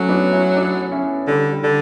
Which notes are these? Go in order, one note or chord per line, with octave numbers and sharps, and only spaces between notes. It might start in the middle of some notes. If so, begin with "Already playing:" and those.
Already playing: F#3 A3 C#4
B3 D4
C#4 E4
D4 F#4
C#4 E4
D3 G3
G3
D3